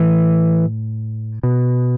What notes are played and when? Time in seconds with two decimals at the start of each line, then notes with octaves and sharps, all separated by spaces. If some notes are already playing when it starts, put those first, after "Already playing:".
Already playing: A2 E3
1.43 B2